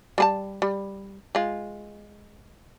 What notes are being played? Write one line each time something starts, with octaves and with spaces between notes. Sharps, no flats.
G3 G#4 A5
G3
G#3 F4